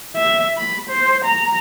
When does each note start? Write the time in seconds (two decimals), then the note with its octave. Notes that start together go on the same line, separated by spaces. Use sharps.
0.16 E5
0.58 B5
0.89 C5
1.24 A#5